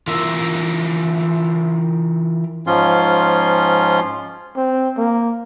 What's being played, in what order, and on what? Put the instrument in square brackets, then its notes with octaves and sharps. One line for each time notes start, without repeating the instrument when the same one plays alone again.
[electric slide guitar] E3 F4 A#4 E5
[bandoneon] G#2 F3 C#4 F4 C6
[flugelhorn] C4
A#3